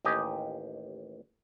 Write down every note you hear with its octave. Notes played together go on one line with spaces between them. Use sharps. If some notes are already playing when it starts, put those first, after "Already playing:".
A1 D#2 G4 D#5 G#5